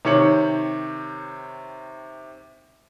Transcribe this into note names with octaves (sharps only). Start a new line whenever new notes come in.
C3 D#3 C#5 C#7 F#7